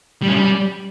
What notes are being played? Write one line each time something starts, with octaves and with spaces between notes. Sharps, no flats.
G3
C#4
G3